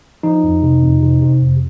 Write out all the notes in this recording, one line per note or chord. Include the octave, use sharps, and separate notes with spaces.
F3 D#4
F2
C3
F2
C3
C3
F2